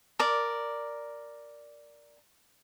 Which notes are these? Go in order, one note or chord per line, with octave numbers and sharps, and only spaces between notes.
A#4 D5